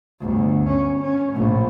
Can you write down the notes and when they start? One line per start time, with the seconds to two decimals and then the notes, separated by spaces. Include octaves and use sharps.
0.21 G1 D2
0.68 C#4
1.01 C#4
1.33 A#1 A2